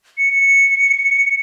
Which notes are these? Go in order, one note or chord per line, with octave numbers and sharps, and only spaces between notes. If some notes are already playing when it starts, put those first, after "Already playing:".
C#7